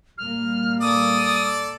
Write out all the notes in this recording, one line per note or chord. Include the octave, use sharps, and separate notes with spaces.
A#2 G3 A#3 F6
A4 D5 D#6